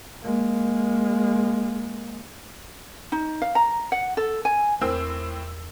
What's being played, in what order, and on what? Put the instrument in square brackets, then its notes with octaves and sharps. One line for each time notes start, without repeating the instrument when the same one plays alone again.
[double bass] G#3 A#3
[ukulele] D#4
F5
A#5
F#5
A4
G#5
[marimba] E2 A#4 [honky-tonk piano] A2 C4 E6